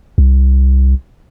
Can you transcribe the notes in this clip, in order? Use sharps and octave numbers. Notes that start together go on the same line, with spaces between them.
C2